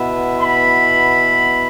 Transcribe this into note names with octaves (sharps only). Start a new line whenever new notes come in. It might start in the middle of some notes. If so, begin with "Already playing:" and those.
Already playing: B2 B3 E4
B5